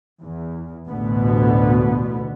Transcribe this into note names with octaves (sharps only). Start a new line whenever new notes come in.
E2
A1 D2 B2 D3 B3